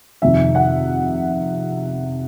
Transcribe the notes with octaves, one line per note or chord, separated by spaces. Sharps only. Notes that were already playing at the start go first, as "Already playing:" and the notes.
F2 C3 D#3 E5
F#5